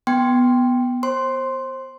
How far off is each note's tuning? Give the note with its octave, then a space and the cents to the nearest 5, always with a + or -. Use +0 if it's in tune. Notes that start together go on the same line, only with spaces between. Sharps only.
B3 +0 G5 +0 C6 +0
C5 +25 C6 +0